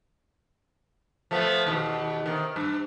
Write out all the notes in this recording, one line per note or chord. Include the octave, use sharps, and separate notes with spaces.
F3 A3 B3
D#2 B2
C3 D#3
G2